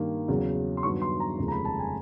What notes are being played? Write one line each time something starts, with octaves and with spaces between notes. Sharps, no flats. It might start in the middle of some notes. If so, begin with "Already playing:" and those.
Already playing: G2 D#3 G3 A#3
E2 C#3 F#3
C6
G2 D#3 F#3 B3 C#6
C6
A#5
F1 D#2 C#3 F3 G#3
A#5
B5
A5
G#5